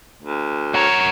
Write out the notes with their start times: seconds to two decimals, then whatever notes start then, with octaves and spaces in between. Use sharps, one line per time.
0.23 D2
0.75 F#4 A#4 C#5